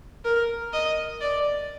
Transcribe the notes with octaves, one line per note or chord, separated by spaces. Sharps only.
A#4
D#5
D5